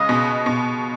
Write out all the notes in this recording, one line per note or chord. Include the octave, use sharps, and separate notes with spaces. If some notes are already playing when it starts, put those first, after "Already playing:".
Already playing: C#3 G#3 D#5
B2
B2